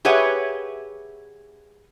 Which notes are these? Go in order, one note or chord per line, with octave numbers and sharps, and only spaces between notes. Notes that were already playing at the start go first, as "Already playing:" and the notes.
G4 G#4 B4 C#5 E5 F#5